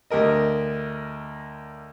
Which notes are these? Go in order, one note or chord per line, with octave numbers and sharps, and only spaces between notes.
D2 G4 A#4 D#5